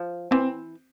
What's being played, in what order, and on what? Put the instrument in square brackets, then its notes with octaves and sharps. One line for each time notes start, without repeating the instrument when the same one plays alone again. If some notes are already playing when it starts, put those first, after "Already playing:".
Already playing: [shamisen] F3
[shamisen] E3 [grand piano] C4